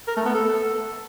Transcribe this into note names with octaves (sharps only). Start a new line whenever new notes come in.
A#4
A3
B3
A4